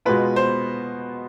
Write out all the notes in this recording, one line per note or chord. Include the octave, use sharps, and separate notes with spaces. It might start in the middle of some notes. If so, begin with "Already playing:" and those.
B2 G#3 B3 F4 B4
C5